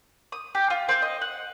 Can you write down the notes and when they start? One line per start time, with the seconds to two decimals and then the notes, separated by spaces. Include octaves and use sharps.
0.32 D#6
0.55 G4
0.70 F4
0.89 C4
1.02 D#5
1.22 F#5